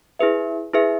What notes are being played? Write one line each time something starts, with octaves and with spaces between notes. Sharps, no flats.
E4 G#4 B4 E5
E4 G#4 B4 E5